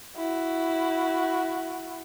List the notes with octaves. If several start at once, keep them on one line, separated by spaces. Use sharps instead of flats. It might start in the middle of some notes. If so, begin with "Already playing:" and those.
E4 F#4